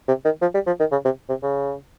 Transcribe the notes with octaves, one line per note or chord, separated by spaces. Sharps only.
C3
D#3
F3
G3
F3
D#3
C#3
C3
C3
C#3